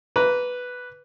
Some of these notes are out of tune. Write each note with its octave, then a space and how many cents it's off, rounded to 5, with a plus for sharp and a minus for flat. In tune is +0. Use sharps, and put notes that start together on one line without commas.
B4 +0 A#5 +0 D6 -30